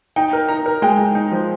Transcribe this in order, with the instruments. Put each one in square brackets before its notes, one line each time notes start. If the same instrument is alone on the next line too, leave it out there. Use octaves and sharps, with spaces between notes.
[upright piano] D#4 [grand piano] G5
[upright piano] A#4
[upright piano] D#4 [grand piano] A#5
[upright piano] A#4
[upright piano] G#3 [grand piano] G5
[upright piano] G#3
D#4
F3